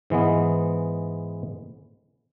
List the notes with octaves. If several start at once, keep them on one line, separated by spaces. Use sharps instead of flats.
G#2 E3 G#3 B3